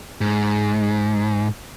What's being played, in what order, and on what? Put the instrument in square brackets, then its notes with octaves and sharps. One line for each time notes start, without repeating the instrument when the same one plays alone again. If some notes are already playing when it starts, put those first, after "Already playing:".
[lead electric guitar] G#2